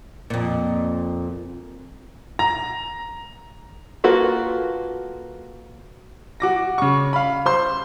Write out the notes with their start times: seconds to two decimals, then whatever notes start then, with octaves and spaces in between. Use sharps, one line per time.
0.30 F2 A#2
2.39 A#5
4.04 A#3 F4 F#4 A4 B4
6.40 F#4 D6 A#6
6.78 C#3 C#6
7.13 F5 B5
7.46 C5 C6